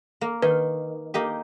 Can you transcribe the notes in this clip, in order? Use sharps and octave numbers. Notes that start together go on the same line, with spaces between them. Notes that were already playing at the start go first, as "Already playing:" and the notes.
A#3
D#3 B4
A#3 D#4 G4